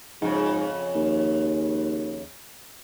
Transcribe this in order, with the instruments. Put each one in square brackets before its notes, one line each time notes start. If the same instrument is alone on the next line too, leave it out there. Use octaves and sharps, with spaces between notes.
[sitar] F2 C#3 [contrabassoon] G#2
[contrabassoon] D#2